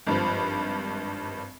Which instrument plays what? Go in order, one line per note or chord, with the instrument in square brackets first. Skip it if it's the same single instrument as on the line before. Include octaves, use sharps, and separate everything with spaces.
[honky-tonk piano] G#1 G2 F3